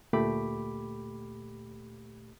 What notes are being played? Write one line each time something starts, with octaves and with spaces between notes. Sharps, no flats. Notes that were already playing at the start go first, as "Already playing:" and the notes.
D2 A#2 A3 G4 B5 D6